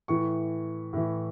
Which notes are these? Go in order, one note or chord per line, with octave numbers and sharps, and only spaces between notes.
A2 E3 C#6
A2 E3